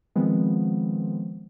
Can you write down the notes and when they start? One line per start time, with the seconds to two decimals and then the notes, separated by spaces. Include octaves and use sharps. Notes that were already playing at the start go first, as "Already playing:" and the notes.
0.16 D#3 F3 G#3 B3 C4